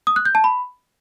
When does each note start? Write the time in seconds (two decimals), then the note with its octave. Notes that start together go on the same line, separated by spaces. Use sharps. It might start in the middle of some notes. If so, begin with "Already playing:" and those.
0.07 D#6
0.16 F#6
0.25 G6
0.35 A5
0.44 B5